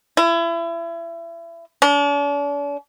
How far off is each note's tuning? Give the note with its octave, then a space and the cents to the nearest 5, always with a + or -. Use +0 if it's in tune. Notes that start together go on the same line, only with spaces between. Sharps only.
E4 +30
D4 -45